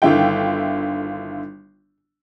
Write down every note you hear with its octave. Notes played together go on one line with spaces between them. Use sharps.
G1 D3 D#3 E4 F4 G5